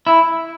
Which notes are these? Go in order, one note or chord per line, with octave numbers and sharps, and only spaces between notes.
E4